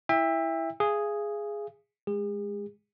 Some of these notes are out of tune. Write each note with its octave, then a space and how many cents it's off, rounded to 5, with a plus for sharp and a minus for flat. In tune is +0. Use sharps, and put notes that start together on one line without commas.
E4 +0 E5 +0 G5 +35
G#4 +0 F5 -35
G#3 +0 G#4 -40